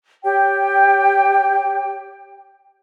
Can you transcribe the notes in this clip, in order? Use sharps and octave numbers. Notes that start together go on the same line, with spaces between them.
G4 C#5 G5